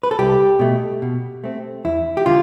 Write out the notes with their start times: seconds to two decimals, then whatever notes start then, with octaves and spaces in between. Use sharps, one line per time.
0.03 B4
0.11 A4
0.19 C2 G4
0.59 B2 A3
1.02 B2
1.44 A3 C4
1.85 E2 E4
2.17 G4
2.26 D3 F4